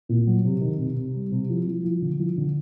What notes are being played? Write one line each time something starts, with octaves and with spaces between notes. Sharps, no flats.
A#2
F#3
C3
D#3
C3
C3
G3
C3
F3
F3
F3
D3
F3
D3